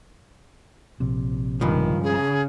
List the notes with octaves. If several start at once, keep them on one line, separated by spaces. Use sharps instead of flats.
A#1 C3
C#2 G2 D#3 F3
C#3 G#4